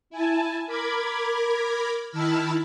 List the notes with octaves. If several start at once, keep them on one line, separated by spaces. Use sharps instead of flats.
E4 G#5 A5
A#4 B5 D6 G#6
D#3 E4 A5 B5 E6 F6